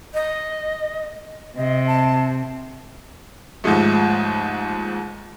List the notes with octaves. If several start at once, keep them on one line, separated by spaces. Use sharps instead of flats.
D#5
C3 D#5
A5
D#2 G#2 F3 G#3 A3